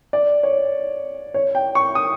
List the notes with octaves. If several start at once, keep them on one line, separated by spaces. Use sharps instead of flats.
D5
C#5
C#5
G5
C#6
D#6